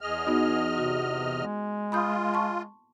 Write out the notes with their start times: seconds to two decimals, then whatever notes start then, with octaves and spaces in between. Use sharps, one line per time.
0.01 E2 G#4 D#5 F6
0.27 B3 D#4 F#4
0.78 C3 F#4
1.43 G#3
1.92 F4 B5 D#6 G6
2.34 A5 C6 C#6